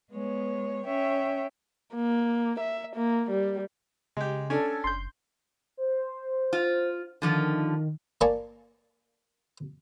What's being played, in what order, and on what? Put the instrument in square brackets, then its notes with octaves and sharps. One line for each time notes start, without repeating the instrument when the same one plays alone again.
[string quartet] G#3 B3 C#5
C#4 C#5 E5 G5
[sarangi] A#3
E5
A#3
G3
[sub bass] C#3 [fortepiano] G#3 G4
[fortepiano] C#4 D4 [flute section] A4 [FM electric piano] G#6
[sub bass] F#1 [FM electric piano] C6 G6
[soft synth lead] C5
[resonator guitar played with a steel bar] F4
[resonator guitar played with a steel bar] D3 F3 F4 [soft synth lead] D#3
[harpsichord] A#3 D5 G#5 A5 C#6